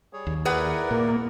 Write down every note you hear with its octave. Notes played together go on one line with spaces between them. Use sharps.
G3 G#4 C#5
D#2
E4 G#4 A#4 B4 D5 F#5
A#2 A#3